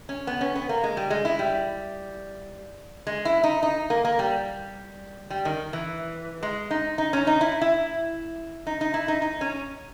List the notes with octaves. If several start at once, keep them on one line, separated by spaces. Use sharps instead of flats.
C#4
B3
C#4
B3
A#3
G#3
G3
G#3
E4
G3
G#3
E4
D#4
D#4
A#3
A#3
G3
G3
D#3
E3
G#3
D#4
D#4
C#4
D#4
E4
E4
D#4
D#4
E4
D#4
D#4
C#4